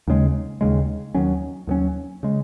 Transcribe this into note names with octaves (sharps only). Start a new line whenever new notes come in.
D#2 C#3 G#3
D#2 C#3 G#3
D#2 D#3 F#3 C#4
D#2 D#3 F#3 C#4
C#3 G#3